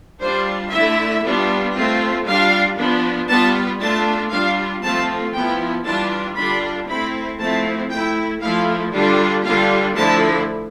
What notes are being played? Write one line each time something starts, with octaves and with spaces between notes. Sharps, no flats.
G3 D4 F4 C5
D3 A3 E4 E5
G3 B3 D4 F4
A3 C4 F4
G3 D4 F4 F5
F3 B3 D4
G3 B3 F4 A5
A3 D4 F4 A5
G3 D4 F4 F5
F3 A3 C4 F4 A5
F3 B3 E4 G5
E3 G3 D4 F4 A5
D3 G3 D4 F4 B5
A3 C4 E4 B5
F3 A3 C4 E4 A5
A3 E4 G5
F3 A3 E4 F5
D3 G3 D4 F4
D3 G3 D4 F4 F5
D3 F3 A3 E4 A5